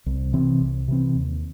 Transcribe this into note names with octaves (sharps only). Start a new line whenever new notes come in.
C2
C3 E3 C4
C2
C3 E3 C4
D#2